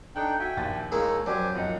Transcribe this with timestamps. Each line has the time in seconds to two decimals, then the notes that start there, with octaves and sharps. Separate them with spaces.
0.16 D4 D#4 A4 G5 F#6
0.39 F#4 E5 G5 G#5
0.57 A#1 D#2 A6
0.92 G#3 A#3 D#4 E4 C#5
1.26 F#2 G4 C5 D5 G#5 D6
1.55 F2 A#2 A#3 D#4 F#5